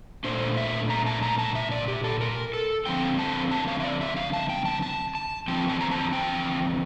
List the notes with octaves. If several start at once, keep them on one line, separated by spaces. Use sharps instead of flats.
A#2 A3 D4 C5
E5
A#5
A5
A#5
A5
E5
D5
G4
A4
A#4
A4
D3 F3 C4 G5
A5
A5
F5
E5
D5
E5
F5
A5
G5
A5
A5
A5
E2 D3 F3 C4 G5
A5
A#5
A5
G5